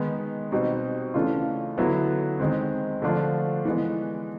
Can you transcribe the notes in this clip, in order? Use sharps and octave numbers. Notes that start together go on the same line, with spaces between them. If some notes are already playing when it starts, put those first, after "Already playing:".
Already playing: D#3 G#3 B3 D#4
B2 G3 C4 D#4
C#3 E3 A3 D4 F4
D3 F#3 B3 E4
D#3 G#3 C4
D3 F3 A3 D4 F4
E3 G#3 B3